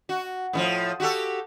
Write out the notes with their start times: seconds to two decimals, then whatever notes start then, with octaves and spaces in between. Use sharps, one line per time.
0.09 F#4
0.53 A2 D#3 F3
1.00 F#4 G4 A4